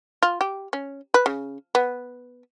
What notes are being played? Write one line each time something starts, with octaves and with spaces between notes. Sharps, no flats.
F4
G4
C#4
B4
C#3
B3